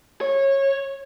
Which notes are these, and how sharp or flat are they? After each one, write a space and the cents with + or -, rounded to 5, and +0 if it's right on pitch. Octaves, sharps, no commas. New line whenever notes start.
C#5 -20